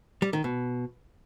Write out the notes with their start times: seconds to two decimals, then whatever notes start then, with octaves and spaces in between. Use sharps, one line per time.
0.22 G3
0.33 D#3
0.44 B2